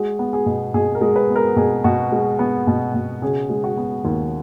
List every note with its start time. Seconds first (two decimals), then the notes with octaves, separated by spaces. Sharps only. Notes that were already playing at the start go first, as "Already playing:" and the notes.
Already playing: G#3 F#4
0.19 B3
0.33 G#4
0.46 B2
0.74 B2 G#4
0.95 A#4
1.01 G#3
1.16 B4
1.29 B3
1.36 A#4
1.56 B2 G#4
1.84 B2 F#4
2.12 G#3
2.39 B3
2.67 B2
2.94 B2
3.22 C#3 G#4
3.50 G#3
3.64 F#4
3.77 B3
4.05 D#2